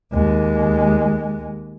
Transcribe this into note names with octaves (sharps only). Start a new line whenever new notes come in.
D#2 G#3